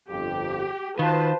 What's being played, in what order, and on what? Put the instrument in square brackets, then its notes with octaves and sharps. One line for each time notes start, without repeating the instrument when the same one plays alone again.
[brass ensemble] G1 F2 [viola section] G4
[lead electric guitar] D#3 [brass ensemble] F4 F#4 F5 [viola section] B4 C5 A5